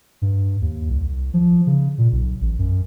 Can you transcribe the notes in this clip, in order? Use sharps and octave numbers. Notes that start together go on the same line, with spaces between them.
G2
D#2
C2
F3
C#3
A#2
B1
A1
F#2